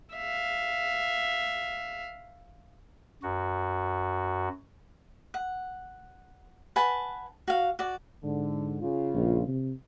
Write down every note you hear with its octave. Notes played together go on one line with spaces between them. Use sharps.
E5 F5
F#2 F#4
F#5
B4 F#5 G#5 A5
F#4 F5
F#4 D5
G#2 D3
C#3 F4
A#1
C3